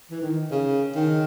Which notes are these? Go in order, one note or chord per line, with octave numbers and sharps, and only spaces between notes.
E3
D#3
C#3
D#3